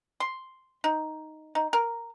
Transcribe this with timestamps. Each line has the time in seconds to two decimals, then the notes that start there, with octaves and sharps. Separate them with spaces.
0.20 C6
0.84 D#4
1.55 D#4
1.73 A#4